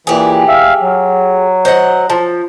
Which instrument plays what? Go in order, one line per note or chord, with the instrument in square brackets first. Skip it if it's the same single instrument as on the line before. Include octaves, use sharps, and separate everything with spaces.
[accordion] A#2 E3 [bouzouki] G4 G#4
[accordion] E5 F5
F#3
[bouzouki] C5 D#5 F#5
F3